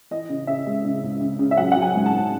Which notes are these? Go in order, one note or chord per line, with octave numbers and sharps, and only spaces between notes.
E3 D#5
C#3
C#3 E5
G#3
C#3
C#2
C#3
C#3
E5
F#3 F#5
F#3 F#5
G#5
G#2
A5
G#2